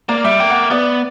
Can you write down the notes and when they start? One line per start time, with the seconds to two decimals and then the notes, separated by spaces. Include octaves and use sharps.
0.09 A#3 D5
0.24 G3 E5
0.40 A#3 G5
0.50 F#5
0.71 B3 D5